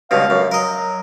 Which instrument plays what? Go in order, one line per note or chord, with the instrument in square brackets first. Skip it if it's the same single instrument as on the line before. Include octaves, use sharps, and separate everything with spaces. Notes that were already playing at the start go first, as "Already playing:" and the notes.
[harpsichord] C#2 G2 B2 [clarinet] F5
[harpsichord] F#2
[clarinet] F#3 [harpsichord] A#4 D#5